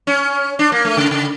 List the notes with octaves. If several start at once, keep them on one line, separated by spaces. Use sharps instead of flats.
C#4
D4
A#3
A3
C#3
C#3